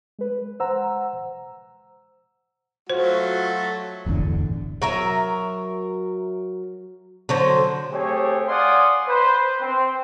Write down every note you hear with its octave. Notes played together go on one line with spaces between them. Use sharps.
G#3 B4
C5 F#5 A#5 E6
F#3 A3 F4 F#4 C5
D1 G1 E2 D3
F#3 A#4 E5
D3 F#3 C5
A3 C4 G4 G#4 C#5
D5 F5 F#5 G#5 C6 D#6
B4 C5
C4 C5